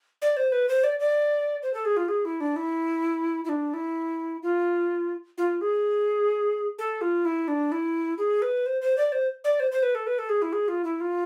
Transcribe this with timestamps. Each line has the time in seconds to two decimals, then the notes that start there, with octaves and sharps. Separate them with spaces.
0.22 D5
0.37 C5
0.52 B4
0.69 C5
0.84 D5
1.00 D5
1.63 C5
1.74 A4
1.85 G#4
1.97 F4
2.08 G#4
2.25 E4
2.40 D4
2.56 E4
3.45 E4
3.49 D4
3.74 E4
4.43 F4
5.38 F4
5.61 G#4
6.79 A4
7.01 F4
7.25 E4
7.48 D4
7.72 E4
8.18 G#4
8.42 B4
8.66 C5
8.82 C5
8.97 D5
9.12 C5
9.44 D5
9.60 C5
9.72 C5
9.83 B4
9.95 A4
10.07 B4
10.19 A4
10.29 G#4
10.42 E4
10.53 G#4
10.68 F4
10.84 E4
11.00 F4